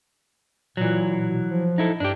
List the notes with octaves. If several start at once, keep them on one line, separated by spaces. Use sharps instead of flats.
A#2 E3 F#3
B2
F3
D#4 E4 A4
G2 D4 G4